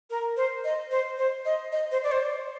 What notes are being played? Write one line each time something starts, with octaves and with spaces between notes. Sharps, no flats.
A#4
C5
D#5
C5
C5
D#5
D#5
C5
D5
C5